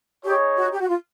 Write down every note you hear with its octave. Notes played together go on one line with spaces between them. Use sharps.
D#4 G4 G#4 C#5
F#4
G4
F#4
F4